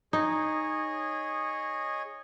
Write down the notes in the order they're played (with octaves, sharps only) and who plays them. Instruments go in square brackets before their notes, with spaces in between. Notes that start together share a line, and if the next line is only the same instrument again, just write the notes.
[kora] D#4 [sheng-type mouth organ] G#4 C#5 D#5